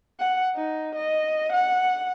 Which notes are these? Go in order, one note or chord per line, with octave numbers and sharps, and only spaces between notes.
F#5
D#4
D#5
F#5